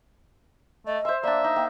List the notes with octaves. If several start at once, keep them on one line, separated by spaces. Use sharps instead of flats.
A3 D#5
C5 E5 C6
A#3 D4 D5 E5
D#4
A#3 G5